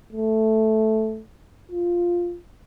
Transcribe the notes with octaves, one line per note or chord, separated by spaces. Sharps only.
A3
F4